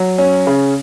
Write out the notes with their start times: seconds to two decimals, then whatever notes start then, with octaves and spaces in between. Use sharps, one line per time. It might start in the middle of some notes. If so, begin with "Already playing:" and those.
Already playing: F#3
0.18 C#4
0.47 C#3